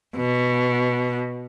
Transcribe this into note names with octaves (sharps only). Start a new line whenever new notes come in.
B2